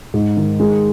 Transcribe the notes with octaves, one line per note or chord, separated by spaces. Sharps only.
G#2
D#3
G#3